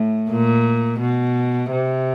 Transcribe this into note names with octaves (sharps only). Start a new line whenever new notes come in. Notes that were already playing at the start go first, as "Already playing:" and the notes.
Already playing: A2
A#2
B2
C3